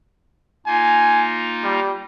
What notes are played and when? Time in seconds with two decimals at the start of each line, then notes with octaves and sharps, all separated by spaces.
0.66 A#3 D#4 F4 G#5
1.64 G3